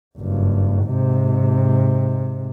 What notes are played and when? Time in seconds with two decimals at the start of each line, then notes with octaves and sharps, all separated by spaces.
0.18 F#1 G2
0.85 G#2 C3